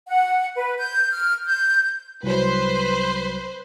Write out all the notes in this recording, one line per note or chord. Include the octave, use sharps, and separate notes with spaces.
F#5
B4
G6
F6
G6
C2 F#3 B4 C5